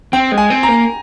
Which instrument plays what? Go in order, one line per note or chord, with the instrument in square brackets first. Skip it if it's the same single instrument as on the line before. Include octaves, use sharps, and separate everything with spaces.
[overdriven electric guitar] C4 [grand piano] G5
[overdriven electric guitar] G#3
[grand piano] G#5
[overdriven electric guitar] C4
[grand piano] A#5
[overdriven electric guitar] A#3